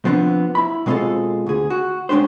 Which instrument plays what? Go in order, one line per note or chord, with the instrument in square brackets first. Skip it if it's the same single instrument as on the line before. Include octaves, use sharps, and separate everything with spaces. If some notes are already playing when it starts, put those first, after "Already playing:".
[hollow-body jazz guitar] F3 B3 C4 D4
E4 B5
B2 G#3 C4 F4 G#4 A4
D2 G#4
F#4
G#3 C#4 D4 G4 C5